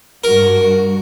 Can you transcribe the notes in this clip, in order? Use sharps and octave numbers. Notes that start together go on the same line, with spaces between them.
G2 F#4 A#4